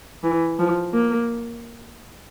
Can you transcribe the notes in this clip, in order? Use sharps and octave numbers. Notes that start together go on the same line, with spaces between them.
E3
F3
A#3